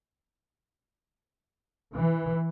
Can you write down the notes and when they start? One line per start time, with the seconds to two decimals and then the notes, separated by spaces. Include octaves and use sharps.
1.95 E3